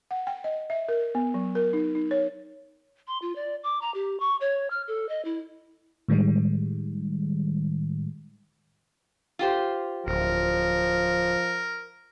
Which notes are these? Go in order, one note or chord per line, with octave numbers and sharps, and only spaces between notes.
F#5
G5
D#5
E5
A#4
B3
F#3
A#4
D#4
D#4
C#5
C6
F4
D5
D6
A#5
G4
C#6
C#5
F6
A4
D#5
E4
A2 D#3 G3 G#3
F4 G4 C5
D1 F3 A#4